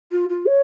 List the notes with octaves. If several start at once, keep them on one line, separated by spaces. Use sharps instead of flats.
F4
F4
C#5